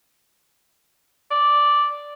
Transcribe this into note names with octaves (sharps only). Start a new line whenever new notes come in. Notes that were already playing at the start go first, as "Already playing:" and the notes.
D5